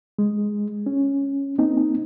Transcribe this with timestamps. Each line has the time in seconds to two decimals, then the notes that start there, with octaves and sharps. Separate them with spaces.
0.19 G#3
0.86 C#4
1.58 A#3 C4 D#4